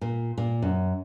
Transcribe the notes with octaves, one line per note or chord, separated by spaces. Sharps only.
A#2
A#2
F#2